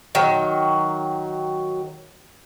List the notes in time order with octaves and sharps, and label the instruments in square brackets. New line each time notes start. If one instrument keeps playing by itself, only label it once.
[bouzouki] D#3 F#3